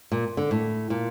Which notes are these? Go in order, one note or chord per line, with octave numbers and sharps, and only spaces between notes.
A#2
D3
A2
A#2